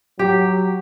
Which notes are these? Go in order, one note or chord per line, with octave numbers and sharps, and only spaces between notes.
F#3 G4